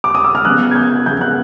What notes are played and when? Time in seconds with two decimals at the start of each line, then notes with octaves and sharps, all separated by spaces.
0.04 D6
0.15 D#6
0.24 E6
0.35 F6
0.45 C#3 F3 G#3 B3 F#6
0.71 G#6
0.76 G6
1.06 C#3 F3 G#3 B3 G6
1.21 F#6